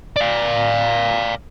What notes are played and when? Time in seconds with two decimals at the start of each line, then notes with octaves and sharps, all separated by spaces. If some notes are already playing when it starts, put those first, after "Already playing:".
0.16 D5 F5